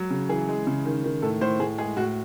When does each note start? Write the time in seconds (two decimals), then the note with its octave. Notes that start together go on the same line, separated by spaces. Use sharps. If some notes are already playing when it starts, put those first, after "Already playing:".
Already playing: F#3
0.11 C#3
0.29 E3 G#4
0.48 G#3
0.67 C#3
0.85 D#3
1.04 D#3
1.22 A2 A4
1.41 A2 C5
1.60 A2 G#4
1.78 G#3 G#4
1.97 A2 F#4